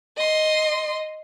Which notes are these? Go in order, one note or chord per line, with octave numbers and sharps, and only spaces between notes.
D#5 C6